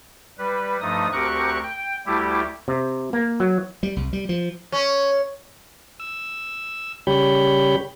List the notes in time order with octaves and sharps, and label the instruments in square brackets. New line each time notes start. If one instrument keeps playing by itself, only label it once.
[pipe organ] G3 B4
G2 F3 A3 D#4 D#6
D2 C4 G4 A#4 C#6 F#6
G5
D2 G3 A3 E4 G4
[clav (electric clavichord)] C3
A#3
F#3
[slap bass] G3
C2
G3
F3
[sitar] C#4
[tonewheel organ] E6
C#3 G3 G4 C#5 B5 G6